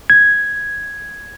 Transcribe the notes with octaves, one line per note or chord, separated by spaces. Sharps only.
G#6